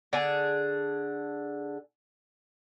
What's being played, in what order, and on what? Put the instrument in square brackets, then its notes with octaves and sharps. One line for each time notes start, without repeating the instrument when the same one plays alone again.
[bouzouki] D3 G#4